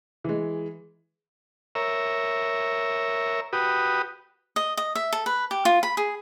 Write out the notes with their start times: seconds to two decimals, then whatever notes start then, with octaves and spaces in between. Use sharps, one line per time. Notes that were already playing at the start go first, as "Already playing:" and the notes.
0.24 E3 G#3
1.75 A#4 C#5 E5
3.53 F#4 G4 B4 D#6
4.56 D#5
4.77 D#5
4.95 E5
5.13 A4
5.26 B4
5.51 G4
5.65 F4
5.83 B5
5.97 G#4